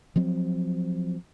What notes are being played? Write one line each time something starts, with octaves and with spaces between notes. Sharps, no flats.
F3 F#3 C4